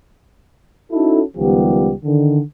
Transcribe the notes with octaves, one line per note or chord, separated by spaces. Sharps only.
C#4 D#4 E4 F#4 A4
C#2 D#3 F3 G3 B3 G4
D3 D#3